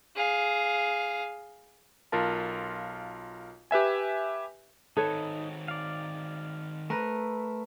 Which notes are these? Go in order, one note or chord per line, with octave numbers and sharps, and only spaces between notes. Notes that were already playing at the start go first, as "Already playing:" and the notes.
G#4 F5
B1 F4 A#4 A5
G4 B4 E5 G#5
D#3 C4 D#4 A4 B4 C#5
D5 F5
A3 A#4 B4